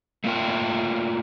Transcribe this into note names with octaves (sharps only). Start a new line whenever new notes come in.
A3 A#3 F4 A#4 G5